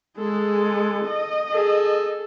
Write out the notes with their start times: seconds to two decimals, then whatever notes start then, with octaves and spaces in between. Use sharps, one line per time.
0.18 G#3 G#4 A4
1.06 D#5
1.52 G#4 A4